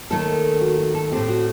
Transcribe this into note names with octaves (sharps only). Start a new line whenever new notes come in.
D#2 D#3 A3 A4
F#4
F#4
A4
A2 A3 C4 G4
F#4